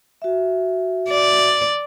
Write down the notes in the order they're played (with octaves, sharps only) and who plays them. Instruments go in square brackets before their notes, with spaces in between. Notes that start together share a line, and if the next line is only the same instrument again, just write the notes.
[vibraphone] F#4 E5
[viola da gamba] D5